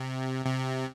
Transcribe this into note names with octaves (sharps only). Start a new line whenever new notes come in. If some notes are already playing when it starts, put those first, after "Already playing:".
Already playing: C3
C3